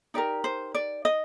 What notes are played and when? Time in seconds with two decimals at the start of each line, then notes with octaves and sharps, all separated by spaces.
0.14 D#4 G4 A#4 D5
0.44 C5
0.75 D5
1.05 D#5